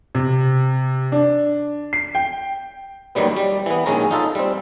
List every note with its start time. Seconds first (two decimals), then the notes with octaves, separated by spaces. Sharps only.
0.15 C3
1.12 D4
1.93 C7
2.15 G5
3.15 D#2 D#3 F#3 G3 B3
3.37 G3
3.66 E3 B3
3.86 A#1 D#3 G#3 C#4 A#5
4.11 D#4 F4 A4
4.35 G3 C4